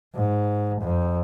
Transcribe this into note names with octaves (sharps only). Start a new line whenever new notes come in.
G#2
F2